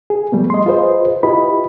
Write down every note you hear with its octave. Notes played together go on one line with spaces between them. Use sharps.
G#4
F3 G3 A3 B3
D#5 C6
F4 G#4 B4 C5 D#5
E4 F4 G4 B4 D#5 B5